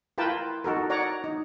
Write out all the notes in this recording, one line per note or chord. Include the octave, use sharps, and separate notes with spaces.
E4 F4 A#4 B4 G5 A5
D#4 F#4 A4 A#4
C#5 D5 F#5 A#5
D#4